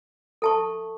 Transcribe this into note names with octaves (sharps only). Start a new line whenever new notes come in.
A4 E5 A5 C#6